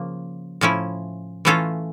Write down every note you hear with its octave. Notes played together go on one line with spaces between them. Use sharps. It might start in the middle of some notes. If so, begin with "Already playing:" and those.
Already playing: C#3 F3 A#3
A2 F3 C#4 E4
E3 A3 C#4 F4 A4